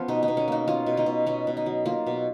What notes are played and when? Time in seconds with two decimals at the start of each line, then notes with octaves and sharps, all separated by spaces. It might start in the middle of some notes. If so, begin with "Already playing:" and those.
Already playing: F3 B3 C#4 F4
0.08 B2 D#4
0.23 D#4
0.28 B2
0.37 C#4
0.48 A#3 D#4
0.68 C#4 F4
0.86 B2
0.97 D#4
1.06 B2
1.27 B2 C#4
1.47 B2
1.57 D#4
1.66 F#3
1.86 A#3 F4
2.07 B2